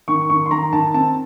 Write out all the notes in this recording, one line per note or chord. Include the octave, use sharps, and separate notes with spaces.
D#3 C#6
D#3 C#6
C6
D#3 A#5
D#3 A5
C4 A5